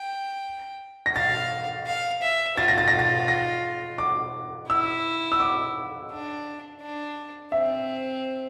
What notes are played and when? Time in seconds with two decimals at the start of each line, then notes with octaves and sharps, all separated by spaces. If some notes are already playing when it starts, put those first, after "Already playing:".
Already playing: G5
1.06 A#6
1.16 F5 A6
1.86 F5
2.22 E5
2.58 F4 A6
2.68 A#6
2.78 A6
2.88 A#6
2.99 A6
3.28 A#6
3.98 D6
4.69 E4 E6
5.32 E6
5.40 D6
6.11 D4
6.81 D4
7.52 C4 E5